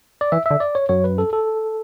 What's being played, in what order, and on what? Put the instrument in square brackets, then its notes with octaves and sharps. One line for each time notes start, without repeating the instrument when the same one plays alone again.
[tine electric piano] D5
[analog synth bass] E3 [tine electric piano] E5
[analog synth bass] D3 [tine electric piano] E5
[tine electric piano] D5
C#5
[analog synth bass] F#2 [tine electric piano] C#5
[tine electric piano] B4
A4
A4